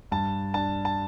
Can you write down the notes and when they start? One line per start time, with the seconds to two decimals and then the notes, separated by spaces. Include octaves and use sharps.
0.12 G2 A5
0.54 D4 A5
0.85 A5